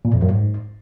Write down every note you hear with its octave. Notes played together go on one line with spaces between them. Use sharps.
A#2
F2
F#2
G#2